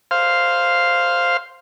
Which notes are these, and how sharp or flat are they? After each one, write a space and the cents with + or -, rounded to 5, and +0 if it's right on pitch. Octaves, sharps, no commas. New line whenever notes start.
C5 +0 F5 +0